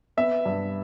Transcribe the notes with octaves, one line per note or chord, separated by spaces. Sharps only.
B3 E5
G2